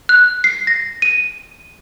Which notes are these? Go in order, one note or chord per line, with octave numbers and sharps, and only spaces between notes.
F#6
C7
A#6
D#7